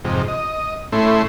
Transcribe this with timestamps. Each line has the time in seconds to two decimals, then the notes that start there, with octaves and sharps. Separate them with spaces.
0.04 F2 G#2 C3
0.28 D#5
0.92 A2 A3 C#4 E4 C6